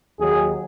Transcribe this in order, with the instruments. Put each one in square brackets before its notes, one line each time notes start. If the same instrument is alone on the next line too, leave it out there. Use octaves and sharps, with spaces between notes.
[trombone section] D#2 D#3 F#3 G#4